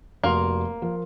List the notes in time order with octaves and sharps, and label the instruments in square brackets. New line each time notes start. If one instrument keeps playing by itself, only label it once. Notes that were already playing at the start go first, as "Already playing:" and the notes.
[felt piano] F1 F#4 C6 [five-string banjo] A#3
[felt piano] F3 F4 A#4